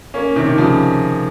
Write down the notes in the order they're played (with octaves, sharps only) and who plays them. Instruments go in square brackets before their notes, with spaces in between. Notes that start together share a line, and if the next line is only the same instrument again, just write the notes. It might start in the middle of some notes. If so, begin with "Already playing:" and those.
[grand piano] A#3 C#4
C3 D#3
C#3 F3